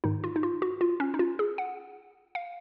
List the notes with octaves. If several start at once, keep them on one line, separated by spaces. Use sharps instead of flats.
G#2 D#3 D#4
F4
D#4
F4
F#4
F4
C#4
D#4
F4
G#4
F#5
F5